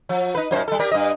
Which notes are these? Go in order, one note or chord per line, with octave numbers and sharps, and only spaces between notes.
F3
D#4 B4
F#2 A#2 C5
G3 A4
G4 A#4 D5
G2 D#5